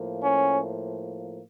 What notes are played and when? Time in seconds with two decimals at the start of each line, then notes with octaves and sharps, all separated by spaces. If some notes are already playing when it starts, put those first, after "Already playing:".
Already playing: A2 F3 A#3
0.24 C#4